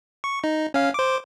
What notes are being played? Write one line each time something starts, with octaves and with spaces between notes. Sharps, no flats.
C#6
D#4
C#4 F5
C5 D6